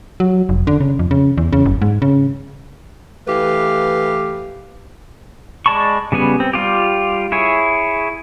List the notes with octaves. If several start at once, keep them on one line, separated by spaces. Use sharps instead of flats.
F#3
F1
D3
C#3
F2
C#3
E2
C#3
F#1
G#2
C#3
E3 A3 G4 B4 F5
G#3 D5 A5 B5 C#6
C#3 G3 B3 G#5
C4
G3 F4 G4
E4 G#4 C#5